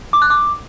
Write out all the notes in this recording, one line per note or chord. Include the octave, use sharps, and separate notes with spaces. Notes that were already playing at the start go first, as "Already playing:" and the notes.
D6
F#6
D6